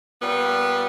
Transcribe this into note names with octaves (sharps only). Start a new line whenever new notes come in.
A#2 G3 B3